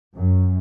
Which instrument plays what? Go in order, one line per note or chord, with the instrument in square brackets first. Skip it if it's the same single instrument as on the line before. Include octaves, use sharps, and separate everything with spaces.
[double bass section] F#2